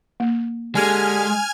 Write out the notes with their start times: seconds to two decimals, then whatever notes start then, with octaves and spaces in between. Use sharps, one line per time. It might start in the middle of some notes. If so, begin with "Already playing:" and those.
0.20 A#3
0.75 D3 G#3 G4 G#5 F6 G#6